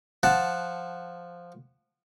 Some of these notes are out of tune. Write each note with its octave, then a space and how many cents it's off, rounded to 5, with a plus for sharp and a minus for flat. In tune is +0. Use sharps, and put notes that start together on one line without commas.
F3 +0 F#5 +0 A5 +0